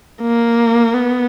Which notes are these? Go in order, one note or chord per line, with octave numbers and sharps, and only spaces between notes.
A#3
B3